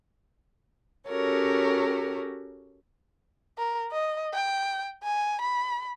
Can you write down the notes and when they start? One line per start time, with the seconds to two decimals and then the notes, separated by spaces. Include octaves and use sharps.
1.07 C#4 F#4 G4 A4 A#4 C#5
3.58 A#4
3.92 D#5
4.34 G5
5.03 G#5
5.42 B5